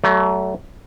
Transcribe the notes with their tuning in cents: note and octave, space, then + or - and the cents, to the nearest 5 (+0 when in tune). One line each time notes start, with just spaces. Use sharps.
F#3 +35 A3 +0